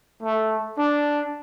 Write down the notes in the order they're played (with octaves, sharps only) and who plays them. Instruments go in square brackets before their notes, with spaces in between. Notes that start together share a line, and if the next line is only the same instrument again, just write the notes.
[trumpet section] A3
D4